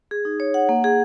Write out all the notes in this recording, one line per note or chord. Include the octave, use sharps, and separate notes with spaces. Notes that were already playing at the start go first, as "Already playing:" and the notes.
G#4
D#4
C#5
F#5
A#3
G#4